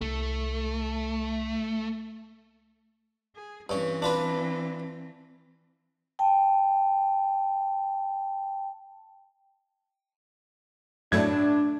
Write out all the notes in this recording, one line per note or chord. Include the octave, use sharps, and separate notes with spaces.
C2 A3
G#4
G2 E3 C4 C#4
D4 F4 B4
G5 A5
F#2 A2 F#3 A3 D4 G#6